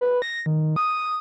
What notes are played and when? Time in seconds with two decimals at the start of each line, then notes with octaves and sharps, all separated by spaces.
0.01 B4
0.22 A#6
0.46 D#3
0.76 D#6